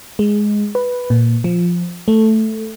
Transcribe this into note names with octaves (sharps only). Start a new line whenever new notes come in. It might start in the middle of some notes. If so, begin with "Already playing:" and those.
G#3
B4
A#2
F3
A3